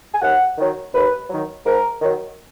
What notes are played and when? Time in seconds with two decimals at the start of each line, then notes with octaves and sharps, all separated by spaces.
0.14 G#5
0.22 D#2 F#5
0.58 D#3 F#3
0.93 D#2 B4
1.30 D#3 F#3
1.65 G#2 A#4
2.01 D#3 F#3